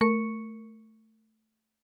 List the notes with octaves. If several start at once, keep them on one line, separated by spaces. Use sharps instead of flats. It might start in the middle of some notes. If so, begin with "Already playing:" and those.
A3 A#4 C#6 C#7